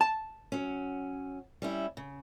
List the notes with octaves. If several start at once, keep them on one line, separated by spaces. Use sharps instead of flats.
A5
F#3 C#4
G3 C#4 E4
C#3